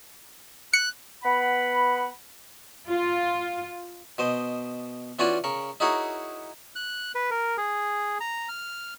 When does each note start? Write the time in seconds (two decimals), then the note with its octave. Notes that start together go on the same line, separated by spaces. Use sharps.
0.73 F#6 C#7
1.23 B3 F#5 B5
2.89 F4
4.18 B2 C5 D#5
5.19 E3 C#4 F4 F#4 D5 G#5
5.44 C#3 A#4 C#6
5.80 D#4 E4 F#4 G#4 A#4 C#5
6.76 F#6
7.15 B4
7.31 A#4
7.58 G#4
8.20 A#5
8.49 F6